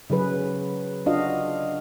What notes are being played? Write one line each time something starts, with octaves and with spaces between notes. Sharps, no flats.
C#3 F#3 G#4 B4
D4 F4 F#4 D#5 F5